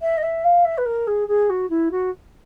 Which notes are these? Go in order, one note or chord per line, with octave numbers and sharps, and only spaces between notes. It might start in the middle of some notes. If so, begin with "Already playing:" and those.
E5
D#5
E5
F5
E5
B4
A#4
G#4
G#4
F#4
E4
F#4